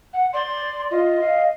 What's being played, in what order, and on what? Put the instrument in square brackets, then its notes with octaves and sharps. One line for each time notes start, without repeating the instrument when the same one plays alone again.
[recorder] F#5
[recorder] D5 [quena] C6
[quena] F4 [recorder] D#5
[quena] F5